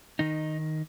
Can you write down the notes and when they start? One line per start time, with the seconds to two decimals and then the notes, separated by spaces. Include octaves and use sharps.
0.19 D#3 D#4